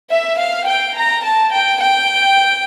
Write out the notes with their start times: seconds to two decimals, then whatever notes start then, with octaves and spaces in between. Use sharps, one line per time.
0.11 E5
0.39 F5
0.67 G5
0.95 A#5
1.24 A5
1.52 G5
1.80 G5